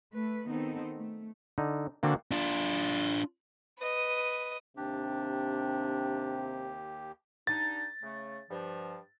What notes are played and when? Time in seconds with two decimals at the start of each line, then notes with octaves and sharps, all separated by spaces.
0.14 A3 B4
0.46 D#3 B3 C4 D#4 A4
0.95 A3
1.58 D3 D#4
2.03 D3 A#3 C4 F#4
2.31 D4 F4
3.79 B4 D#5
4.77 D#2 C3 D4 G4
7.47 G2 D4 D#4 A6
8.02 C#3 A3
8.50 G2 F3